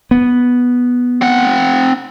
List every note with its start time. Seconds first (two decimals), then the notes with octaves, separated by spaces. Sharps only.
0.11 B3
1.22 C4 F#5